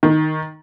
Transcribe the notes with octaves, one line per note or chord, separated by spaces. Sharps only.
D#3